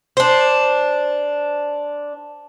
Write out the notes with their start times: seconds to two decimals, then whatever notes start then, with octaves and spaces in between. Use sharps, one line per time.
0.17 D4 C5